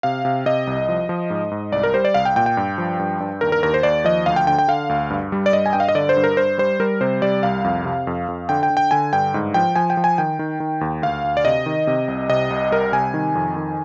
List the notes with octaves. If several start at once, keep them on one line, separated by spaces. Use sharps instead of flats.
C3 F5
C3
C3 D#5
C2
F3
F3
G#2
G#2
C2 D5
A#4
G3 C5
D5
C2 F5
G5
A#2 G5
G5
G2
F3
G2
G2
D#2 A#4
A#4
D#2 A#4
C5
D#2 D5
F3 D#5
D2 F5
G5
D3 G5
G5
D3 F5
D2
G2
G3
D5
G2 D#5
G#5
G2 G5
F5
D#5
D3 D5
C5
G2
A#4
G2 C5
G3 C5
G3 A#4
C3 C5
G3 D5
C2 F5
F2
C3
F2
F2
D3 G5
G5
D3
G5
D3 G#5
G2 G5
G#2
F3 G5
F3 G#5
G5
F3
G#5
D#3 G5
D#3
D#3
D#2
D2 F5
D2
D5
C3 D#5
D#3
C3
C2
C3 D#5
C2
G3 A#4
C3 G#5
D#3
F2
D#3